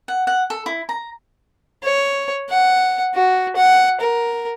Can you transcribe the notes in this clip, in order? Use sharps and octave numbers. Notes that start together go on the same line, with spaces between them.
F#5
F#5
A4
E4
A#5
C#5
F#5
F#4
F#5
A#4